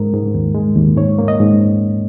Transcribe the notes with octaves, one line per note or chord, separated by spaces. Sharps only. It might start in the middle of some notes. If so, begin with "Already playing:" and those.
Already playing: G#2 G#3 A#4
G#2
D#2
G#3
D#2
G#2 C#5
A#3
D#5
G#2